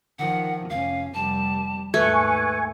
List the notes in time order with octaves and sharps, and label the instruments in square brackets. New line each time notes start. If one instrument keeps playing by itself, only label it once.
[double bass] D#3 F3 [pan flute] F#5
[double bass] F1 C#4 [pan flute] F5
[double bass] F1 G3 [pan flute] A5
[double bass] D#2 G#2 [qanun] A3 [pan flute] B4 [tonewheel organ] G#5 C#6